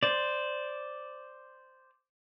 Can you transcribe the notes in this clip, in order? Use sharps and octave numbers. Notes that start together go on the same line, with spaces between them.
C5 D5